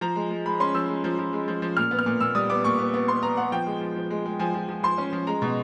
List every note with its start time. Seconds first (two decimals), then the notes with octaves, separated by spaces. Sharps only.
0.01 F3 A#5
0.16 G#3
0.31 G#3
0.46 G#3 B5
0.60 C#4 C6
0.74 F3 E6
0.89 G#3
1.04 F3
1.19 F3
1.33 G#3
1.48 F3
1.62 F3
1.77 A#2 F6
1.91 B3
1.99 F6
2.06 A#2
2.20 A#2 E6
2.35 G3 D#6
2.50 B3 D6
2.64 A#2 C#6
2.79 B3
2.94 B3
3.08 B3 C6
3.23 B3 A#5
3.37 B3 F#5
3.52 F3 G5
3.66 G#3
3.81 F3
3.96 F3
4.10 G#3
4.26 G#3
4.39 F3 G#5
4.54 F3
4.69 F3
4.83 F3 C6
4.98 C#4
5.13 F3
5.27 G#3 A#5
5.42 B2